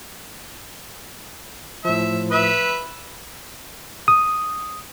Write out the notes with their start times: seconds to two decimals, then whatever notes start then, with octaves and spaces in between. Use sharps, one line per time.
1.85 A2 F3 E5
2.31 B4 E5
4.08 D#6